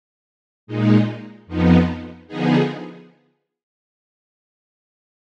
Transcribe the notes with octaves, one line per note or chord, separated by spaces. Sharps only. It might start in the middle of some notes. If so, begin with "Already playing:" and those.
A#2 G#3 D#4
F2 F3 B3 D#4
D3 F3 B3 D#4 G#4